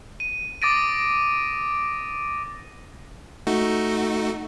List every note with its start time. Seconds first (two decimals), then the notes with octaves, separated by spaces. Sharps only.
0.20 D#7
0.62 D6 D#6 A6 A#6 D7 D#7
3.47 A3 D#4 F#4